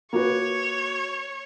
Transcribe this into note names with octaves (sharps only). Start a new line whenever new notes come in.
A#3 F#4 B4 C#5